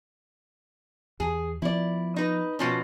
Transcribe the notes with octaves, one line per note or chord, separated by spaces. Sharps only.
E2 G#4
F3 B3 E4 D5
D#4 B4
B2 F3 C#4